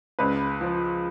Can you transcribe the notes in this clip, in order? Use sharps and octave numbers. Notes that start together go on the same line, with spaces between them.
C#2 B4
F3